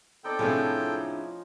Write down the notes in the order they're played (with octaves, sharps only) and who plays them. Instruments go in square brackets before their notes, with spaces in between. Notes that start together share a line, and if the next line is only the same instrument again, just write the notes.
[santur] C4 D#4 D5 [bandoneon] A4 G5
[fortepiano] A2 C3 [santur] F3 C#4 G#5 [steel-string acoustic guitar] D4 E4 G#4